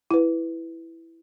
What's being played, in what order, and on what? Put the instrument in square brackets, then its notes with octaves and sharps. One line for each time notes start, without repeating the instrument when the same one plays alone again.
[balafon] E4 B4